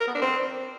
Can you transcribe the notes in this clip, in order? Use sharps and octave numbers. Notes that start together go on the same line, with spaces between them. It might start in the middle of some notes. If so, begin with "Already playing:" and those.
A#4
B3
D4
C4